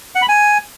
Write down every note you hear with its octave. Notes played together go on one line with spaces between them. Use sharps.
F#5
B5
G#5